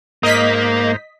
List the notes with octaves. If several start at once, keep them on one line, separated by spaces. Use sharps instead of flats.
G#2 A#3 C5 D#5 A#5 B6